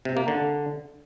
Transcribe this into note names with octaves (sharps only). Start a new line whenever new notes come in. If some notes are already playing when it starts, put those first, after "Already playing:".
C3
A#3
D3